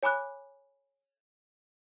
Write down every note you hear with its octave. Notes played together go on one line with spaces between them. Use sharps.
C#5 G#5 B5 D6 F#6